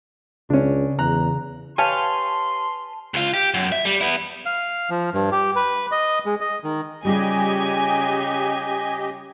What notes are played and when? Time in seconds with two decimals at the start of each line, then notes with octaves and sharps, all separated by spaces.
0.50 C#2 C#3 C#4 D4
0.99 E2 A#5 F#6
1.78 G4 B4 C#5 F5 G#5 A5 C6
3.14 C#2 F4
3.34 G4
3.54 F#2
3.72 E5
3.85 G3
4.01 B3 E4
4.46 F5
4.90 F3
5.14 G2
5.32 G4
5.56 B4
5.91 D#5
6.26 G#3
6.41 D#5
6.64 D#3
7.05 C#3 G3 F4 G4 G#4 D#5 G#5